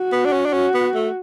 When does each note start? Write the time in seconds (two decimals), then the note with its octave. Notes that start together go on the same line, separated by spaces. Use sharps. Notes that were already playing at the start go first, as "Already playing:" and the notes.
Already playing: F#4
0.12 B3
0.25 D4
0.33 C#4
0.46 D4
0.53 C#4 F#4
0.74 B3
0.94 A3